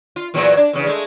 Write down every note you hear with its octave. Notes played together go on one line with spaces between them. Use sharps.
F4
E2 A#2 F#3
D4
E2 C#3
G#3 A3